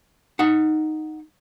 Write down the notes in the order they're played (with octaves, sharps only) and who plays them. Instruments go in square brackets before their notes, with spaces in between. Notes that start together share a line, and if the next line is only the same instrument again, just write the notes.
[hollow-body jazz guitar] D#4 F#5